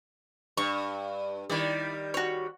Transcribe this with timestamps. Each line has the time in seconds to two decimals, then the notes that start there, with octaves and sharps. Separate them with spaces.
0.57 G2 C#6
1.50 D#3 G3 E4 D5
2.14 F#4 C#5